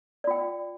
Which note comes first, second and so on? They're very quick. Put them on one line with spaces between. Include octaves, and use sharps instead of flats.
D5 F4 G5